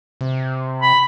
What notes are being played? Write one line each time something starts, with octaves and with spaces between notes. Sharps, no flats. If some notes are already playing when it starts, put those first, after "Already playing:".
C3
B5